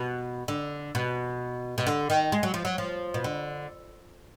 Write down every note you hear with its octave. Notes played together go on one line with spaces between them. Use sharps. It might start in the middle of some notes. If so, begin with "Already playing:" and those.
Already playing: B2
D3
B2
B2
D3
D#3
G#3
F#3
F3
F#3
F3
B2
D3